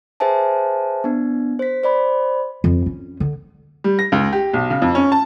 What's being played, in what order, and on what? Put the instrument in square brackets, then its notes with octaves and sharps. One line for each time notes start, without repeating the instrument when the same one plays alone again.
[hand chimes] G#4 B4 C5 E5 G#5 A5
B3 D4
C5 B6
C5 D5 B5
[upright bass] F2
C#4
D3
[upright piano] G3
A#6
C#2
G4
B1
C#3
F2
C#4
A5